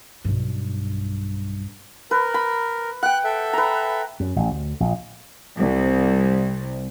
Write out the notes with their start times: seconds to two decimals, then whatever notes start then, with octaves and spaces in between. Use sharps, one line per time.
0.25 B1 G2
2.11 A#4 B4
2.34 B5
3.03 F#5 G5 F#6
3.24 A4 E5
3.53 B4 A#5
4.20 F#2
4.36 A1
4.51 D2
4.80 A#1
5.57 C2